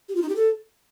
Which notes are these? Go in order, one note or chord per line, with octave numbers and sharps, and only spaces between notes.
G4
F4
D#4
G4
A4